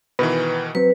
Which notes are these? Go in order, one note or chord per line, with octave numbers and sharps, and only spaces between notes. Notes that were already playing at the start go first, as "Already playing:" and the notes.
B2 D#3 E3 B4
F#3 C4 B4